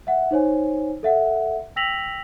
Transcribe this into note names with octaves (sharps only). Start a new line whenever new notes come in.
E5 F#5
D#4 C5 C#5 G#5
A4 E5 F#5
G5 E6 A#6 B6 F7 F#7